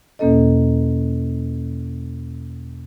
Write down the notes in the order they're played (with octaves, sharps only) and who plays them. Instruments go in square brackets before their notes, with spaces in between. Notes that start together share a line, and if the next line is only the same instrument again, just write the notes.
[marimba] E2 B2 A#3 C#4 A4 D#5